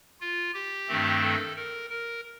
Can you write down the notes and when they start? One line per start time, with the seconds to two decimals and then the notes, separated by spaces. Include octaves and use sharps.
0.21 F4
0.54 G4
0.88 G2 D#3 A3 C4
1.22 A4
1.56 A#4
1.90 A#4